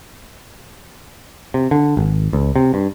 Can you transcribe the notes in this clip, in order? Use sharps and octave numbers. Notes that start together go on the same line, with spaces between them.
C3
D3
G#1
C#2
C3
G2